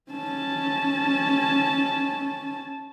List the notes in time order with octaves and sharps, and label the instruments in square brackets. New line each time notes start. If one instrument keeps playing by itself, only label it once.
[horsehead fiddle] C#4 A5